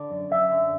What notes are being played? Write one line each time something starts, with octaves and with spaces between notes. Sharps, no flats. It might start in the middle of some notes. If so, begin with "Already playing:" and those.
Already playing: D3 D5
F#2
F#2 E5
D3